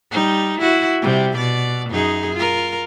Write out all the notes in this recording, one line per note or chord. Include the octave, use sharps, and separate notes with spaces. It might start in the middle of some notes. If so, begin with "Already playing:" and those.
G3 D#4
E4 F#4
C3 G3
B2 D5
F#2 D#4 G#4
F4 A#4